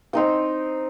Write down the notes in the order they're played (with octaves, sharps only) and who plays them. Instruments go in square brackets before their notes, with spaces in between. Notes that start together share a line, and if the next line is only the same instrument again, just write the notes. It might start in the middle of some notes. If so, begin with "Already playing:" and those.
[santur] C4 D#4 G5